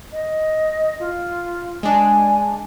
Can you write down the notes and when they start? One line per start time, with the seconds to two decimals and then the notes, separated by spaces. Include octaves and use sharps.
0.13 D#5
1.00 F4
1.83 G#3 D4 G#5